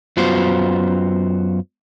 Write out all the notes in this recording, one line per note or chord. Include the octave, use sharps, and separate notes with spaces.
F#2 B3 F4 F#4 C5